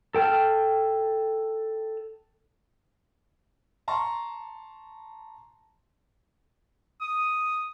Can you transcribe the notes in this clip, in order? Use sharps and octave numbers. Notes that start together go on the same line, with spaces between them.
A4 G5 A5 F6
A5 A#5 C6 C#6
D#6